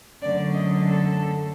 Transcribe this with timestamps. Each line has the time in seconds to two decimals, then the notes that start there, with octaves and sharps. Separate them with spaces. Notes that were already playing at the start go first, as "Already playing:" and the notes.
0.22 F#2 D3 F#3 A3 D5
0.53 D#5
0.84 A4